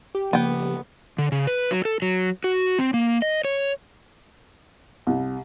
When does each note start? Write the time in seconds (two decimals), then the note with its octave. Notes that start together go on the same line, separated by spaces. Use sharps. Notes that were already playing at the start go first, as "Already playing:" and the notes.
0.15 G4
0.33 C#3 F3 A#3 B3 G5
1.18 D3
1.32 C#3
1.47 B4
1.71 F#3
1.85 A4
2.02 F#3
2.44 F#4
2.78 C4
2.94 A#3
3.22 D#5
3.45 C#5
5.07 C2